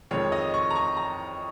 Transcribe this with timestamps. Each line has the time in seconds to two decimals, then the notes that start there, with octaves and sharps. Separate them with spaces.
0.11 F2 D#3 G#3 C#5
0.32 D#5
0.54 C#6
0.70 A#5
0.75 C#6
0.97 A#5